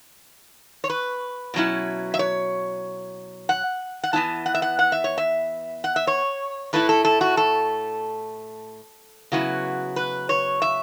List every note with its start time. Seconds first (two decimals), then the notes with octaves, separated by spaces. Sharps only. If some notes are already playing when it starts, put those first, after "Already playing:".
0.84 C#5
0.90 B4
1.54 B2 F#3 C#4 E4
2.14 E5
2.19 C#5
3.49 F#5
4.03 F#5
4.13 E2 E3 B3 E4 A5
4.46 F#5
4.55 E5
4.62 F#5
4.79 F#5
4.92 E5
5.04 C#5
5.18 E5
5.84 F#5
5.96 E5
6.07 C#5
6.73 A2 A3 E4 B4
6.89 A4
7.05 A4
7.21 F#4
7.37 A4
9.32 C#3 F#3 B3 E4 F#4
9.96 B4
10.29 C#5
10.62 E5